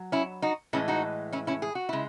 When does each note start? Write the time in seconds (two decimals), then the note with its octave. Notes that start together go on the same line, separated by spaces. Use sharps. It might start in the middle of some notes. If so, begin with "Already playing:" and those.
Already playing: F#3
0.12 C#4 E4
0.42 D#4 F#4
0.73 A2 E3 G#3 C#4 E4
0.88 D#4 F#4
1.33 C#4 E4
1.47 C#4 E4
1.62 G#4
1.75 F#4
1.89 C#3 G#3 E4